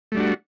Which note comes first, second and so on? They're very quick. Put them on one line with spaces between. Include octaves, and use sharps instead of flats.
A3 G3 D4 F#4